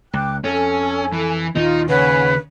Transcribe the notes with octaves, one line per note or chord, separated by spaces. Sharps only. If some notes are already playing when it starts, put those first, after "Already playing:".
C#2 G5 D6 F#6
F2 C#4 A4 G#5
E3
D#2 A#2 D#3 D#4 F4
C#3 B4 C#5 F#5 G#5